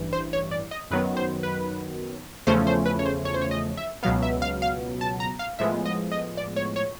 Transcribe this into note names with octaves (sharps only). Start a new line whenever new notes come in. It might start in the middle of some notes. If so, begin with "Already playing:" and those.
Already playing: A1 G2 E3
C5
C#5
D5
D#5
F#2 D#3 F#3 B3 B4
C5
B4
E2 C#3 F3 A3 C#4 C5
C5
B4
C#5
C5
C#5
C5
C#5
D#5
E5
C#2 B2 F#3 B3 F5
E5
F5
F5
A5
A#5
F5
A2 F3 G#3 B3 E5
D#5
D#5
D5
C#5
C#5